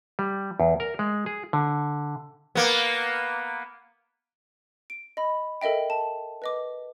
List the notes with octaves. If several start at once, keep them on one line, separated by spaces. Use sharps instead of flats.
G3
E2
A#4
G#3
G#4
D3
A#3 B3
D7
D#5 B5
A4 A#4 D#5 E5 G5
A5
B4 D#5 D6